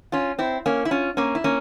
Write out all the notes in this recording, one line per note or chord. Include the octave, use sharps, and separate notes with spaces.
C#4 F4
C4 E4
A#3 C#4
E4
C#4 F4
A#3 C#4
E4
A#3 C#4